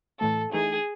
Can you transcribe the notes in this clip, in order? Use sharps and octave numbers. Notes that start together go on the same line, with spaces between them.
A2 E3 A3 A4
E3 A3 D#4 G#4